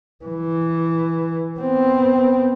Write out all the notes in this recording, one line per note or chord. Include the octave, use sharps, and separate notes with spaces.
E3
B3 C4